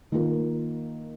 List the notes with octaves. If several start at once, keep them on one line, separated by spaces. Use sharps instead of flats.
D#3 A#3 F4 A#4